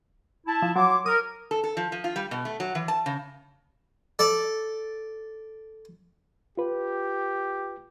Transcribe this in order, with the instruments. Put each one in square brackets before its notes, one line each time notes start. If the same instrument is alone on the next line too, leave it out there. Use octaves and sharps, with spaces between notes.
[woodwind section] E4 A5
[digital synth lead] F3
[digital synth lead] F#3 [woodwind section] C#5 C6 D6
[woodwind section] A#4 [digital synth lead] D#6
[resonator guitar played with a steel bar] A4
A4
F3
F3
F4
G3
B2
A3
F#3
E3
A5
C#3
[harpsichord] A4 D5
[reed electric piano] F4 B4 [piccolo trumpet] G4